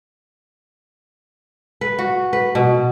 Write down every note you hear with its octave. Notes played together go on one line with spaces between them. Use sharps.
B4
F#4
B4
B2